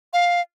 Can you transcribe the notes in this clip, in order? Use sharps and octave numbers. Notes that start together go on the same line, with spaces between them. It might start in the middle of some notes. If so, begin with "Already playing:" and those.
F5